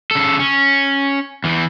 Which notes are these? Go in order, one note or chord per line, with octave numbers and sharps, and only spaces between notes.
C#3 A4
C#4
E2 E3